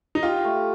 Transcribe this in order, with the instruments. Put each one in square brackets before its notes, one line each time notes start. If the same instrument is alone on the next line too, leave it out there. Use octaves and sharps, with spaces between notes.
[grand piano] D#4
[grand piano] F4 [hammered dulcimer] G4
[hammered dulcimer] A3